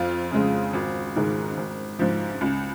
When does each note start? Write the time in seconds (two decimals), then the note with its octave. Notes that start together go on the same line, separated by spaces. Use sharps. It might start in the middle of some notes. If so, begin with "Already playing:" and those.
Already playing: F2 F4
0.31 C#3 G#3
0.73 G#1
1.16 G#2 D#3 G#3
1.57 G#1
1.99 G#2 F3
2.41 C#2